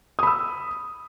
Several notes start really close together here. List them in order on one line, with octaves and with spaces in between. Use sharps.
D#6 B5 E6